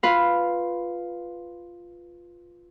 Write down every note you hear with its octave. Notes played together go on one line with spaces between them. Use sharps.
F4 B4 F5